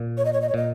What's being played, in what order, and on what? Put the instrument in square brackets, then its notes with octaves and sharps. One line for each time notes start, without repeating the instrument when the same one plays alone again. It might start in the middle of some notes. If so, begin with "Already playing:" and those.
Already playing: [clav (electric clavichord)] A#2
[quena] C#5
D#5
C#5
D#5
C#5
[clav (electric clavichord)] A#2 [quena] D#5